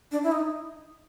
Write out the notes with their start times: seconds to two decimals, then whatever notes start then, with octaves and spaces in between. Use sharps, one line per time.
0.11 D4
0.24 E4
0.32 D#4